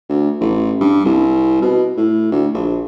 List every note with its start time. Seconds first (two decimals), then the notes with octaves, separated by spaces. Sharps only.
0.09 D2
0.40 A1
0.81 G2
1.05 C2
1.62 B2
1.97 A2
2.32 D2
2.54 A#1